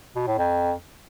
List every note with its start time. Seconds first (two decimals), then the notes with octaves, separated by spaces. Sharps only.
0.16 B2
0.27 A2
0.38 F2